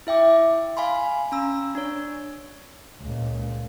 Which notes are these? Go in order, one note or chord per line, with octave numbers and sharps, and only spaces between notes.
E4 E5 G5 D6
F5 G#5 B5 C6
C#4 A#5 E6
D4 C#5
C#2 A#2